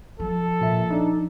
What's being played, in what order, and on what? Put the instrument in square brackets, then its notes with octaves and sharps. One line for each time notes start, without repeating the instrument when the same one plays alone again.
[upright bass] F3 [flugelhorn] A4
[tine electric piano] A#2 E5
D4 D#4